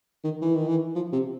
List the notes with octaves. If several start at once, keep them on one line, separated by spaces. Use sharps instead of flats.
D#3
E3
D#3
E3
F3
C3